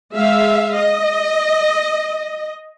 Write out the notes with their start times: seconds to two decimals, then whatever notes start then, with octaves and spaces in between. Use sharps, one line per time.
0.13 G#3 E5 F5
0.75 D#5